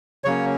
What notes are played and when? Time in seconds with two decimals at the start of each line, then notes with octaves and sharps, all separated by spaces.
0.24 C#3 F#3 A#3 C#4 C#5